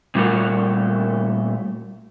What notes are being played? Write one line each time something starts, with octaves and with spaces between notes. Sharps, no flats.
A#2 G3 A3 F#4 A#4